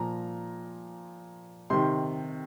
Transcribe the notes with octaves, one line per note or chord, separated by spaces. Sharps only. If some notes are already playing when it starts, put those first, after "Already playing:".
Already playing: A#2 F3 A#5
C3 D#3 C6